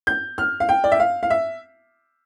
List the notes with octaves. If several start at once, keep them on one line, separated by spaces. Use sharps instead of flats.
G6
F6
F5
G5
D5
E5
F5
F5
E5